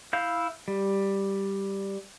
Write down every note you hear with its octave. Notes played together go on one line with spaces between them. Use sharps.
E4 F5 G6
G3